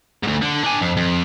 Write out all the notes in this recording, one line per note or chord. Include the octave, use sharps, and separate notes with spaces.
D2 G#2
D3
D4 G#5
F2
F2